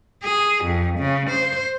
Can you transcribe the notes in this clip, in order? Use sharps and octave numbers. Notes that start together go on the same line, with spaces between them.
G#4
F2
C#3
C5